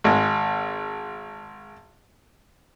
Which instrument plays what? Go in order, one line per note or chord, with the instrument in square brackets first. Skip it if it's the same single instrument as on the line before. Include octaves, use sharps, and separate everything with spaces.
[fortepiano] G#1 G#3